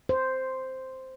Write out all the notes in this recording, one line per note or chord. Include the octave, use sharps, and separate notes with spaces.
C5